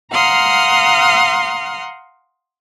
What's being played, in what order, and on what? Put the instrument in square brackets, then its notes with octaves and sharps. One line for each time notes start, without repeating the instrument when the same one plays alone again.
[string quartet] F5 F#5 A#5 C6 D#6 F6